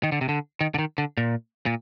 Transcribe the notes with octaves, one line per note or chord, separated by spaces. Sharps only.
D#3
D3
C3
D3
D#3
D3
D#3
D3
A#2
A#2